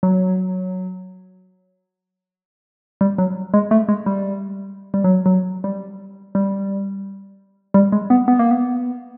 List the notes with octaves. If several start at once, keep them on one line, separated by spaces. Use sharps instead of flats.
F#3
G3
F#3
G#3
A3
G#3
G3
G3
F#3
F#3
G3
G3
G3
G#3
B3
B3
A#3
B3